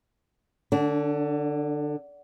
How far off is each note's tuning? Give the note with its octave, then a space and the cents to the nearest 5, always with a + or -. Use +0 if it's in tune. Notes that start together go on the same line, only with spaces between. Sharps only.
D3 +20 D4 -30